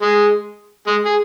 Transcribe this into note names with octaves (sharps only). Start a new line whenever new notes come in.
G#3 G#4
G#3 G#4
G#4